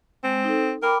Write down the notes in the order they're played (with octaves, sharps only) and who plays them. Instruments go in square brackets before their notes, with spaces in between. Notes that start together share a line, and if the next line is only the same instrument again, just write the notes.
[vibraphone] G#3 [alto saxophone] C4
[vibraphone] D#4 A4
[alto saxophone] A#4 [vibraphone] G5 B5 D6